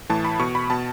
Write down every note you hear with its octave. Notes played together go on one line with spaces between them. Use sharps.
A2 E3 A5
B5
B2 C#6
B5
B2 A5